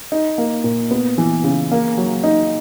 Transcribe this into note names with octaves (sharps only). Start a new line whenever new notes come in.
D#4
A#3
A#2
B3
E3
C#3
A#3
F#3
D#4